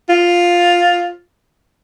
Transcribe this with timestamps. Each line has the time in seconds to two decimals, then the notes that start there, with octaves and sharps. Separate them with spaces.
0.09 F4